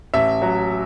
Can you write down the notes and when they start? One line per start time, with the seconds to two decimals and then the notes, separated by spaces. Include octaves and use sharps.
0.14 A1 E5
0.42 F#3